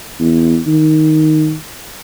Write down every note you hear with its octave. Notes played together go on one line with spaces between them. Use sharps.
E2
D#3